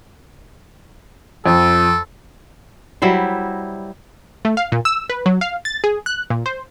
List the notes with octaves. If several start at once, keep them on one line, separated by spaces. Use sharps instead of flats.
F2 A4
F#3 G3 E4 C5
A3
F5
A#2
E6
B4
F#3
F5
A6
G#4
F#6
A#2
C5